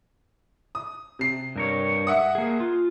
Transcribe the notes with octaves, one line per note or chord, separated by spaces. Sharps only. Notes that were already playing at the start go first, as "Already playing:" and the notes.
D#6
C3 C7
G2 A#4 C#5
E5 F#5 D#6
A#3 G#4
F4